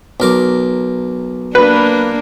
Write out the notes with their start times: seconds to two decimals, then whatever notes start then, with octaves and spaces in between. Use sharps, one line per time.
0.20 B1 A#4 D6
1.55 A#3 D4 B4